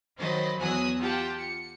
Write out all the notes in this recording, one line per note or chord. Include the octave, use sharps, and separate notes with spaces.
D#3 F#3 C5 D#5 B5 A6
E2 F#3 G#5 D#6 E6 F#6
F4 G4 F#5 G5 A5
C#7